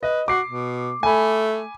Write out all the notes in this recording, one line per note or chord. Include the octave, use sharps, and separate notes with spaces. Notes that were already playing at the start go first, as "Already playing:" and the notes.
B4 D#5
F#4 D6 C7
B2
A3 G#5 B5